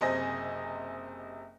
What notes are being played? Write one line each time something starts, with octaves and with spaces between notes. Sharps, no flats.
F#1 C3 C5 D#5 G#5 A#6